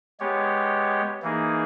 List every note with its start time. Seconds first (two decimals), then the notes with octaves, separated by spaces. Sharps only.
0.20 G#3 B3 G4 C#5
1.22 E3 A#3 D#4 G#4